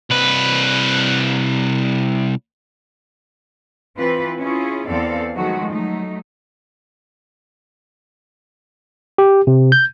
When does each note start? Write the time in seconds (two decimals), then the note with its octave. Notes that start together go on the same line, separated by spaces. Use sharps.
0.11 C2 B4
3.96 E3 C4 F4 B4
4.39 C#4 E4 F4 G#4
4.88 E2 C4 A4 D5 F5
5.34 D#3 F3 F#3 G#3 A3 F#4
5.71 F#3 A3 D#4
9.18 G4
9.47 C3
9.72 G6